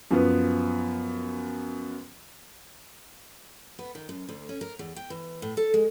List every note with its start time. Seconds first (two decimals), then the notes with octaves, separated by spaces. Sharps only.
0.11 F#2 F3 B3 B4
3.79 B3
3.95 D#3
4.09 F#2
4.29 D2
4.49 C#4
4.61 A#4
4.79 E2
4.96 G5
5.10 E3
5.42 A2
5.57 A4
5.74 G#3